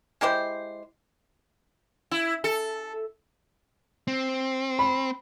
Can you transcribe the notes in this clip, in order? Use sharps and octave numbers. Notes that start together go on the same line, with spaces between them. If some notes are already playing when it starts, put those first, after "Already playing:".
G#3 E4 G4 C5
E4
A4
C4
B5